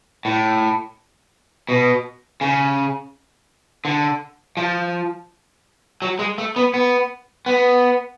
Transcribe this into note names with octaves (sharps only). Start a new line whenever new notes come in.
A2
B2
C#3
D3
F3
F#3
G#3
A3
B3
B3
B3